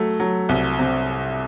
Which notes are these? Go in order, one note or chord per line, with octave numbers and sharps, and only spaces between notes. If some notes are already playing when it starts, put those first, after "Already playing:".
Already playing: F#3 A3
F#3
C2
C3